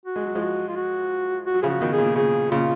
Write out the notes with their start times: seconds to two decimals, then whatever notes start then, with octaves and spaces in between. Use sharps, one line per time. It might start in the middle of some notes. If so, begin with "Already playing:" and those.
0.06 F#4
0.16 G#3
0.26 F#3
0.35 F3 G#3
0.41 F#4
0.68 F4
0.76 F#4
1.46 F#4
1.54 F#3
1.62 C#3 F3 G#4
1.69 F#4
1.80 B2 D#3
1.93 G#4
1.98 A#2 C#3
2.16 A#2 C#3 G#4
2.51 A#2 C#3 F4